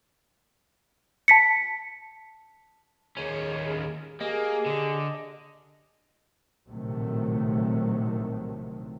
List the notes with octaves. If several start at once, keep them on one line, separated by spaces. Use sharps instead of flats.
A5 B6 C#7
D#2 C#4 G#4
A#3 G4 G#4 D#5
D3
A#1 A2 C3 D#3 F#3 A3